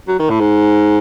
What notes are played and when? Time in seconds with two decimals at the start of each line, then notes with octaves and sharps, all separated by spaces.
0.08 F#3
0.19 D#3
0.29 A2
0.40 G#2